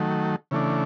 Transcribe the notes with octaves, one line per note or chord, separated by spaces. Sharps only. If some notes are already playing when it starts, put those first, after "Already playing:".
Already playing: D#3 F#3 A3
C#3 E3 A3 D4